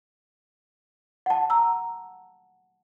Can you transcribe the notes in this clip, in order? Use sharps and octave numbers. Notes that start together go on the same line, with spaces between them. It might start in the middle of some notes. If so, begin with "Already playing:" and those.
F#5 A5
A#5 E6